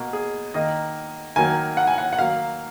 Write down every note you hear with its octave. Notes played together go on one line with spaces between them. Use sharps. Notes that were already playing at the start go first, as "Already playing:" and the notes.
Already playing: B2 A#3
G#4
D#3 A#3 D#5
D#3 F#3 A#3 G#5
F#5
G#5
F#5
F#5
D#3 F#3 A#3 F5